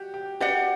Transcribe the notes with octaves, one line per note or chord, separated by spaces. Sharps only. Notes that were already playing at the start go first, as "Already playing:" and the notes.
Already playing: F#4 G4
G4
F#4 G4 D5 F#5